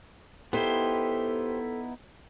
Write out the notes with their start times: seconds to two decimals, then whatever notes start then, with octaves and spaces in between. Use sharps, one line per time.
0.53 B3 D#4 E4 G4 A4 C5